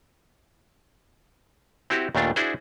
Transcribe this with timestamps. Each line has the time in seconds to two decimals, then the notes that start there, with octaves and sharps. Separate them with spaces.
1.90 C4 E4 F#4 G4
2.15 D#2 A#2 A3 D4 F4
2.36 D4 E4 F#4 G#4 C5